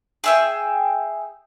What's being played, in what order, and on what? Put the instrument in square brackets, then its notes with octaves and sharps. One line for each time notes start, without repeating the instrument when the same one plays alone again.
[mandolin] G#4 E5 G5